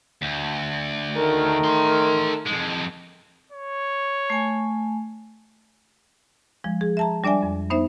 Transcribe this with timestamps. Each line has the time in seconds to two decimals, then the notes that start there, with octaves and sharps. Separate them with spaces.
0.22 D2
1.15 D#3 A3 A#4
1.64 A4 C6
2.46 F2 G#3
3.52 C#5
4.30 A3 G#5
6.64 F3 G#3
6.81 G#4
6.97 E5 A5 A#5
7.24 G3 D4 D5 E5 G#5
7.42 F2
7.70 B3 D#4 C5 E5